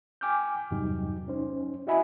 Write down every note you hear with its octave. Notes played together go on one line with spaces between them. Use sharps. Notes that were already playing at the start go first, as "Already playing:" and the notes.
G5 G#5 D6 F6 G6
E2 G2 C3 F#3 G3 D#4
C#4 D#4 C5
E4 F#4 D#5 E5 G#5 B5